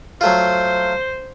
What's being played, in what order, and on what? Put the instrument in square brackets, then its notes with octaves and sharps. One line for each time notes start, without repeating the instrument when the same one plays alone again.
[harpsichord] F#3 A3 F4 [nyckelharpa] C5